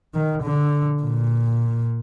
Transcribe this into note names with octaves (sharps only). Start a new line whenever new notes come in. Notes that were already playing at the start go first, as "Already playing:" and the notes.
D#3
D3
A#2